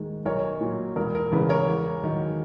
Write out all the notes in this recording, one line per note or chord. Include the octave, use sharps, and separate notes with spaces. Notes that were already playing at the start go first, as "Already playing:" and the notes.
Already playing: D#2 D#3 G#3
B1 A#4 C#5
A#2 F#3
E1 A#4
A#4
E2 C#3 B4
A#4 C#5
E2
D#3 F#3